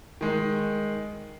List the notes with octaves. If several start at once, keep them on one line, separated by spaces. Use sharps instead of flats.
D#3 G#3 D#4